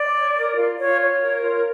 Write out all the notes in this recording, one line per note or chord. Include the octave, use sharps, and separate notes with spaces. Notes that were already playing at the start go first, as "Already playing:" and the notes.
Already playing: D5
C#5
A#4
F4
F4 C#5
C#5
A#4
F4